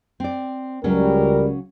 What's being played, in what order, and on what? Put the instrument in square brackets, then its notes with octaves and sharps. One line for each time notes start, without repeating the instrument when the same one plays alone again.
[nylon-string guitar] C4 D5
[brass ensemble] C#2 A#4 [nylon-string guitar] C#3 F#3 C#4 [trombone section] G3